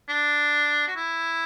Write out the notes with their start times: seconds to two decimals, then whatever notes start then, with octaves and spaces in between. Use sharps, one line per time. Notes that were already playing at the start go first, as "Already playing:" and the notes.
0.09 D4
0.88 F#4
0.96 E4